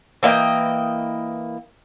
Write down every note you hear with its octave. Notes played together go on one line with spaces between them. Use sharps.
E3 A#3 D#5 G5